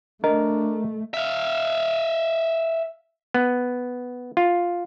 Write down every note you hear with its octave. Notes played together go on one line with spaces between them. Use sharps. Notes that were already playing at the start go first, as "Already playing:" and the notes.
A3 D4 A#4 D#5
E5 F5
B3
F4